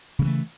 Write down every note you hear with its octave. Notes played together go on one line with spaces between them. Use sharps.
C#3 E3 G3 A3